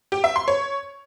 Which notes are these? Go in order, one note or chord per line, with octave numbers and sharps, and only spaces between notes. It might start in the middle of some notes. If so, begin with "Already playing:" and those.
G4
E5
C6
C#5